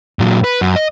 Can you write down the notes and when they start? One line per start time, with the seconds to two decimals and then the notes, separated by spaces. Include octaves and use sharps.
0.19 A#2 F#3
0.44 B4
0.61 F#2
0.76 D#5